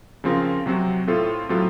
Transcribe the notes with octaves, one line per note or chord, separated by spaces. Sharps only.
C#3 F3 C4 F4 A#4
C3 F#3 C4 F#4
A2 A3 C4 F4 A4
A2 F#3 C4 F4 A4